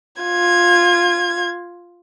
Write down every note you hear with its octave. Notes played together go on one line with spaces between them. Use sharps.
F4 G#6